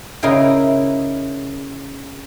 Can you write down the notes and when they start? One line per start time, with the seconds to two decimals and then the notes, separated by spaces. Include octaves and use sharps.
0.23 C#3 D#4 E4 A#4 G5